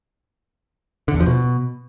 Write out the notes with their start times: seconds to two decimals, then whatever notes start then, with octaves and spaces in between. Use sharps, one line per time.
1.08 D3
1.14 E2
1.20 F3
1.26 B2